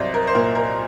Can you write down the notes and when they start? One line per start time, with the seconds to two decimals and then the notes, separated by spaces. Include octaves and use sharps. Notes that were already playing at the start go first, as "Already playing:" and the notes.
Already playing: C2 F#3 C5 D5 D#5
0.14 A#4
0.27 C5
0.35 A#2 A#4
0.55 A#4